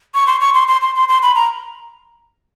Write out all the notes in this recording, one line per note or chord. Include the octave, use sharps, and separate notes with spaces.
C#6
C6
C#6
C6
C6
C6
C6
C6
B5
A#5